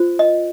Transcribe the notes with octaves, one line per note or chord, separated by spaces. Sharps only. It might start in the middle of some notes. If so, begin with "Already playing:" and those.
Already playing: F4 C5
D#5